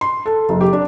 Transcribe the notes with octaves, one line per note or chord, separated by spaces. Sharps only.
C6
A4
F#1
G4
D4